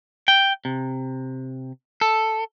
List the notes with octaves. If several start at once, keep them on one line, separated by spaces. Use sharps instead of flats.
G5
C3
A4